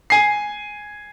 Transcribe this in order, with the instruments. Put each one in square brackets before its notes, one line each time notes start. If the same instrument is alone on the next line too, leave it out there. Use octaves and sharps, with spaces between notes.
[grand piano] G#5 C7